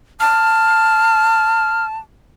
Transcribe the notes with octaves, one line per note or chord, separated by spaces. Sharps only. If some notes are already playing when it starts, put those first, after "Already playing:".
A5 F6